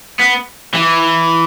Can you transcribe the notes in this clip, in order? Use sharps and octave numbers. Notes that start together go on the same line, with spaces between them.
B3
E3